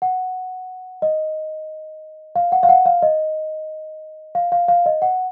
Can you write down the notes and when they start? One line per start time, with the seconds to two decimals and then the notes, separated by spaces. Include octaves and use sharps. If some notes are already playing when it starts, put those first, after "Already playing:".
0.02 F#5
1.02 D#5
2.36 F5
2.52 F#5
2.63 F5
2.69 F#5
2.86 F5
3.02 D#5
4.35 F5
4.52 F5
4.68 F5
4.86 D#5
5.02 F#5